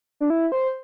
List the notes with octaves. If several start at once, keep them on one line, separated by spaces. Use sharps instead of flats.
D4
E4
C5